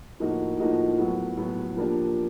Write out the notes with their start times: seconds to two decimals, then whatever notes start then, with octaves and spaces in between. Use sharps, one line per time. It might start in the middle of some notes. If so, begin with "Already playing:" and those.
0.20 A2 F3 A#3 D#4 F#4
0.59 A2 F3 A#3 D#4 F#4
0.98 A2 F#3 B3
1.37 A2 F#3 B3
1.76 F3 A#3 D4 G4